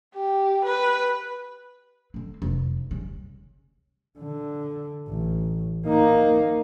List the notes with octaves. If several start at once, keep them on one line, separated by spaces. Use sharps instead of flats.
G4
B4
D3 C4
F1
C#3 G3
D3
A1
A#3 D#4